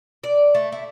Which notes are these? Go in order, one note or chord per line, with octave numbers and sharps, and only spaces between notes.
D5
A3
E4